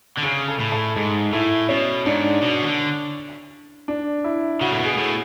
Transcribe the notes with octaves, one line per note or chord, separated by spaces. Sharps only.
D3
C#3 G#4
A4
A2
A4
G#2 G#4
A2 E4
B2 C#4
G#2 D4
B2
E3
D3
D4
E4
C#3 F#4
A2
B2
G#4
A2